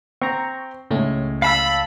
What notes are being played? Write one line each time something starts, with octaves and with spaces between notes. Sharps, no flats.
C4 A#5 C#6
C#2 A2 G#3 A3 C#4
F5 A5 B5 E6